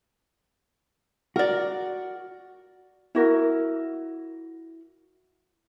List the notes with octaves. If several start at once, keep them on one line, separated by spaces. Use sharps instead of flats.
F#4 A#4 D5
E4 F#4 A#4